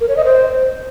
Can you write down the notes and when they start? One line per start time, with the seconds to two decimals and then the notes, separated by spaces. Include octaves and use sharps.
0.01 A#4
0.09 C#5
0.17 D#5
0.25 C5